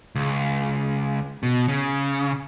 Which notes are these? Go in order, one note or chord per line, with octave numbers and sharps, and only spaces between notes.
C#2
B2
C#3